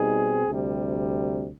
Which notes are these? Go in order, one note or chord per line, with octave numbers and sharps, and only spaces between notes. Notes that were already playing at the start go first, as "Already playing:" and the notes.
Already playing: B2 G3 C4 D#4 G#4
D2 C3 G3